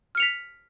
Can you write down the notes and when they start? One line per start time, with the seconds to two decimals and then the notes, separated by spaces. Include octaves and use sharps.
0.15 F6
0.17 C#7
0.20 F7
0.22 B6